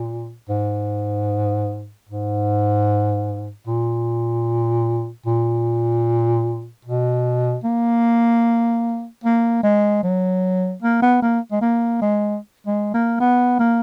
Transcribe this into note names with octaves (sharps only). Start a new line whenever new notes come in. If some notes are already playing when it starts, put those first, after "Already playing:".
Already playing: A#2
G#2
G#2
A#2
A#2
B2
A#3
A#3
G#3
F#3
A#3
B3
A#3
G#3
A#3
G#3
G#3
A#3
B3
A#3